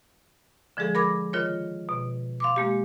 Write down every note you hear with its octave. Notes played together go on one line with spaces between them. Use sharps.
D3 F3 G#3 G#4 A4
A#4 B5 D6 G#6 A#6
D#3 F4 A#4 C#5
B2
F5 C6 D6
G#3 A#3 G4